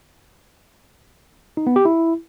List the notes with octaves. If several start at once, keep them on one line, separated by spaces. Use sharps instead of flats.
D#4
B3
G4
E4